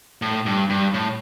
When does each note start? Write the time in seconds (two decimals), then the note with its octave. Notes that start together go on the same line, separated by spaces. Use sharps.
0.22 A2
0.46 G2
0.70 G2
0.94 A2